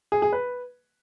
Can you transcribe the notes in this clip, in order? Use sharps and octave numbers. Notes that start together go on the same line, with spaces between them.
G#4
G#4
B4